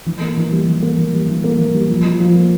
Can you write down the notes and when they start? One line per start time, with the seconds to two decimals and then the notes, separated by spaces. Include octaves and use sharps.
0.06 E3
0.21 A#3
0.37 E3
0.52 G3
0.68 E3
0.82 A#3
0.98 E3
1.14 G3
1.29 E3
1.44 A#3
1.59 E3
1.74 G3
1.90 F3
2.05 F4
2.20 F3
2.35 A#3